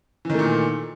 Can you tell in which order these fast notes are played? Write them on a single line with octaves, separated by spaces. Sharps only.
E3 D#3 A3 A#2